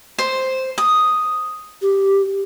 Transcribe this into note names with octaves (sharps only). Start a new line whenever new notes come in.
C5
D#6
G4